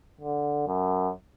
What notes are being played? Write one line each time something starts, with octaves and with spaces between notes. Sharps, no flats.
D3
F#2